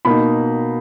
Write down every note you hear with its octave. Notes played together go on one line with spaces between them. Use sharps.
B2 A#3 D#4 B5